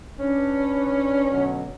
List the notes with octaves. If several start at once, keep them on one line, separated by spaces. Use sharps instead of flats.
C#4 D4 B4
B2 D3 F#3